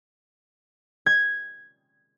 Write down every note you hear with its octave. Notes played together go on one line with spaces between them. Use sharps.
G#6